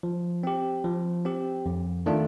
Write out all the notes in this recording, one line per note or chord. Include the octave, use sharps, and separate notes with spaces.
F3
C4 G4
F3
C4 G4
F2
D#3 A3 D4 F4